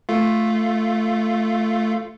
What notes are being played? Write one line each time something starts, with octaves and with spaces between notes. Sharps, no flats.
A3 F4